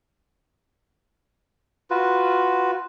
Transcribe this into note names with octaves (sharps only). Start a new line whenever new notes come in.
F4 F#4 B4